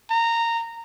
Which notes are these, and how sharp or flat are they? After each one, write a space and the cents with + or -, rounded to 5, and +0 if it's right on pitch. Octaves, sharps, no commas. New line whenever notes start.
A#5 -15